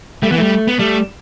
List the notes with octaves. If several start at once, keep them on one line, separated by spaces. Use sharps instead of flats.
G3 A3
E3 B3
G3 A3
B3
G3 A3